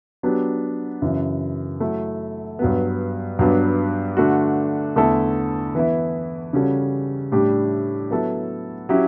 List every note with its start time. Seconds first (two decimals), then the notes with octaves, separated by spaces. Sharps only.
0.23 F#3 B3 D4 G4
1.02 F#2 C#3 E3
1.80 F#3 A3 E4
2.59 G2 F#3 B3
3.39 G2 F#3 B3 D4
4.17 D3 A3 D4 F#4
4.96 E2 D3 A3 E4 A4
5.75 E3 B3 E4
6.53 C#3 G3 C#4 F#4 A4
7.32 A2 G3 D4 G4
8.11 F#3 B3 E4 A4
8.89 F#3 C#4 E4 G4